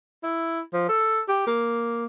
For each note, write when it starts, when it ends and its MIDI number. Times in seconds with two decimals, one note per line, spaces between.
0.23 0.60 64
0.73 0.84 53
0.89 1.21 69
1.29 1.44 67
1.47 2.06 58